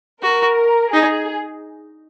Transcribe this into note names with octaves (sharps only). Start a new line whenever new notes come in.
F#4 A#4
D#4 G#4